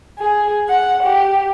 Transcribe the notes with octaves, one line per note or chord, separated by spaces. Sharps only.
G#4
F#5
G4